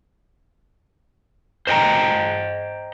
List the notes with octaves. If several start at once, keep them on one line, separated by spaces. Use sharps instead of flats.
C5 D#5 G5 A#5